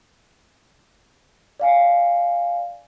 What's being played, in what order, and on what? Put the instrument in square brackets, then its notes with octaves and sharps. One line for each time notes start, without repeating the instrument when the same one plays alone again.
[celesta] D5 F5 G#5